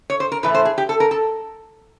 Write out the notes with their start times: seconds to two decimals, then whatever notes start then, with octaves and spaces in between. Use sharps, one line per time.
0.10 C#5
0.20 C5
0.32 A#4
0.43 A2 E3 A3 B4
0.55 C5
0.65 G#4
0.78 G4
0.89 A4
1.00 A#4
1.11 A4